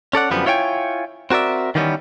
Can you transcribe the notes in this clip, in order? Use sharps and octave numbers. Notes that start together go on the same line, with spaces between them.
C#4 A4 D5 F#5
F#2 D3 F3 G3 B3
E4 F4 C#5 E5 G5 G#5
C4 F#4 A#4 D5 E5
D#3 E3 G3 A#3 B3 C#4